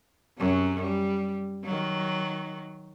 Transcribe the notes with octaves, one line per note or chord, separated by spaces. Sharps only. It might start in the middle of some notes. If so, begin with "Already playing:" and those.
F#2 C3 F#3
G3
D#3 F#3